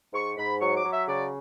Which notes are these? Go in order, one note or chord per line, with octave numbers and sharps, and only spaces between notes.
G#2 C#6
G#2 B5
F#3 C#6
D6
F#3
E5
C#3 D5